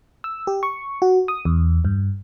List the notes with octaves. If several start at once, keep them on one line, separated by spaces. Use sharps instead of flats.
E6
G4
C#6
F#4
D#6
E2
G2